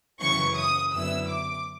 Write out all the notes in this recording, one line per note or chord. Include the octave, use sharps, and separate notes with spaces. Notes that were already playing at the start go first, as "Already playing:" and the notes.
F#2 C#3 E3 C#6
D#6
F#2 D3 F#3 B3 E4 E6
D6